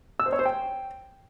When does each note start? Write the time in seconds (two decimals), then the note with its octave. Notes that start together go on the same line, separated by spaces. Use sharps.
0.20 E6
0.26 C5
0.32 C#5
0.39 C5
0.45 G5